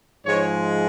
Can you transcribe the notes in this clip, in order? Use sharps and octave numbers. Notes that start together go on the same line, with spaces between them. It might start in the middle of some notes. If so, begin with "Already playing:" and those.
G#2 F3 G#3 C#5